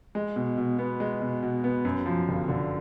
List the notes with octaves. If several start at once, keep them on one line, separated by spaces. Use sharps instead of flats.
G#3
B2
B2
B3
G#3
B2
B2
B3
F#2
F3
G1
D3